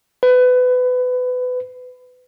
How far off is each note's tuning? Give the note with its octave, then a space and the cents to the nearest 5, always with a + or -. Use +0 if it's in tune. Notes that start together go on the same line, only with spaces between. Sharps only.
B4 +25